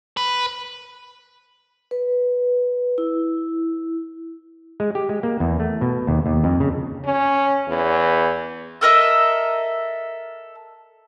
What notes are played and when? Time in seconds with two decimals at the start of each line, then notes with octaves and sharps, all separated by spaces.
0.17 B4
1.91 B4
2.98 E4
4.80 G#3
4.95 G4
5.09 G#3
5.23 A#3
5.40 E2
5.60 A3
5.81 B2
6.07 D#2
6.26 D#2
6.44 F2
6.60 C#3
7.05 C#4
7.68 E2
8.81 A4 A#4 D#5 E5